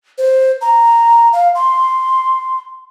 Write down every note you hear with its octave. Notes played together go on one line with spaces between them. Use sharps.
C5
A#5
F5
C6